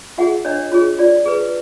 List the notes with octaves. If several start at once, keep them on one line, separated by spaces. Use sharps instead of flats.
F4 G#4 E5 F#5
D4 C#5 D#5
F4 G#4 C#5
F4 D5
G#4 B4